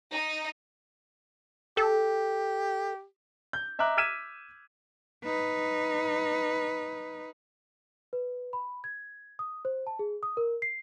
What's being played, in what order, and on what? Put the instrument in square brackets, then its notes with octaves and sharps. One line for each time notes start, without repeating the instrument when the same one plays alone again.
[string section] D#4
[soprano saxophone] G4 [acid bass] A4
[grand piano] G6
D#5 E5 A#5 D6 F#6
E6 F6 G#6 B6 D#7 E7
[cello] D#4 B4
[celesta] B4
B5
G#6
D#6
C5
A5
G#4
D#6
A#4
C7